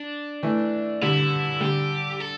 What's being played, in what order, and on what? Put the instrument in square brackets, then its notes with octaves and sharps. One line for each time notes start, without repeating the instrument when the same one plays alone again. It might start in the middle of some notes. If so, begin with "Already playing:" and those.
Already playing: [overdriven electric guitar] D4
[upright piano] E3 A3
[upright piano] D3 G3 [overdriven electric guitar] E4
[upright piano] D3 G3 [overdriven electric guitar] G4
[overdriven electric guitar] A4